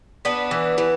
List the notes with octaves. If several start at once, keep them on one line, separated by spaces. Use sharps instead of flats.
B3 D4 B4
E3
E3